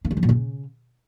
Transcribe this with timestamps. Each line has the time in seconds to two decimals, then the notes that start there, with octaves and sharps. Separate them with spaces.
0.05 A#3
0.11 G#3
0.17 F3
0.23 A#2
0.29 C#3